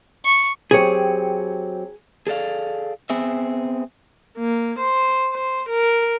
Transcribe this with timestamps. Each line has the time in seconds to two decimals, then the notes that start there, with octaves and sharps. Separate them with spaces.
0.25 C#6
0.71 F#3 C4 G4 G#4 C#5
2.27 G#4 A4 D5 F5
3.10 B3 C4 G#4 E5
4.38 A#3
4.79 C5
5.33 C5
5.69 A#4